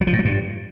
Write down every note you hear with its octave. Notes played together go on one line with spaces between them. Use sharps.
F#3
F3
A2
F#3
G2